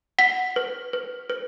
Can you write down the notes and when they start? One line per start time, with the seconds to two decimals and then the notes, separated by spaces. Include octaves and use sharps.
0.18 F#5 B6
0.56 B4
0.93 B4
1.30 B4